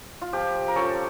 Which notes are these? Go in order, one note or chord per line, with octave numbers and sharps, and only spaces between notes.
F4
F3 G4
A#4
C#4 F4 A4